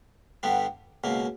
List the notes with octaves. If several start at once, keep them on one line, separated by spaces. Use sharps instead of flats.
G2 D3 G3 B3
C#2 B2 A#3